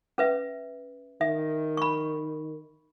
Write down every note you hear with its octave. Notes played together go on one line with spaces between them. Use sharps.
C#4 B4 E5
D#3 E5
B5 C#6